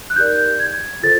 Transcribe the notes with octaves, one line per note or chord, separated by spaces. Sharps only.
F#6
D#4 G4 A#4 D5 G6
G#6
F4 A4 C5 A6